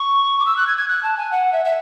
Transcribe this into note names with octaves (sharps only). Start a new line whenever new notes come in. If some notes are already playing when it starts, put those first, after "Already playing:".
Already playing: C#6
D6
E6
F#6
G#6
G#6
F#6
A5
G#5
F#5
E5
E5